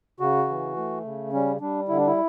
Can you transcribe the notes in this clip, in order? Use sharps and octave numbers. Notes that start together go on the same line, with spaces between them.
C#3 F#4
E3
A3
C#3
G3 C#4
G3 D4
D3 E4
D4
E4